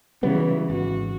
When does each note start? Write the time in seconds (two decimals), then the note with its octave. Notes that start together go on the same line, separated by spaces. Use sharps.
0.23 C#3 E3 F#3 G3 B3
0.70 G#1 F#4